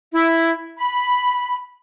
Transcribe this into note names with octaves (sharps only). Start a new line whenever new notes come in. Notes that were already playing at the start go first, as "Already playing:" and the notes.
E4
B5